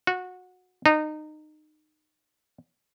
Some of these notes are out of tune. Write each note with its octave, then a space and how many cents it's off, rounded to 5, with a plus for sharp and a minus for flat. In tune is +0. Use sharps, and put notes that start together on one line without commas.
F#4 -20
D#4 -25